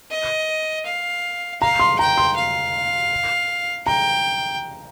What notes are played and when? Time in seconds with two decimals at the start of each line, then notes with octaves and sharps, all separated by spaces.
0.10 D#5
0.86 F5
1.61 F5 A#5
1.79 C6
1.99 G5 A#5
2.17 C6
2.36 F5
3.86 G5 A#5